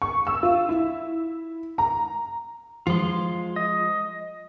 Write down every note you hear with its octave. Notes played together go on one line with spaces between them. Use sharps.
C#6
E6
F4
E4
A#5
F3 G#3 F4 C6
D#5